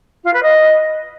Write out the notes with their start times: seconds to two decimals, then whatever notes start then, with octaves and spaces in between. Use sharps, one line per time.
0.24 F4
0.33 B4
0.42 D#5